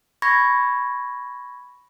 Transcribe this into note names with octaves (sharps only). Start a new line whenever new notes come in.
B5 C#6 G#6 A#6